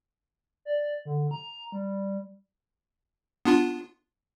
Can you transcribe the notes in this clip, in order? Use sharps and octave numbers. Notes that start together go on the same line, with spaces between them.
D5
D3
A#5
G3
B3 D4 F4